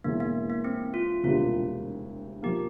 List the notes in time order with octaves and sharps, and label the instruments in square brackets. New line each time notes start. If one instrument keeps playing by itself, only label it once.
[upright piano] E1 E2 E3 [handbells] A#3
[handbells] A#3
A#3
C4
F4
[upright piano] E1 D2 C3 G3 A#3 [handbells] F4
[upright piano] F3 A#3 [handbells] G4